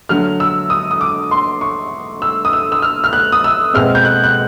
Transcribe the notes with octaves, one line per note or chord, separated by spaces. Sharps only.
D3 F#3 A3 F6
E6
D#6
D#6
D6
C6
C#6
E6
D#6
E6
E6
F6
F6
F#6
D#6
E6
B2 G#3 C4 F6
G6
F#6
F#6